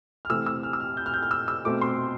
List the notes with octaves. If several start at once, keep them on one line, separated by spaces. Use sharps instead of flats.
F6
C3 E3 A3 C4 E6
E6
F6
E6
F6
G6
F6
G6
F6
E6
E6
B2 A3 C4 D6
C6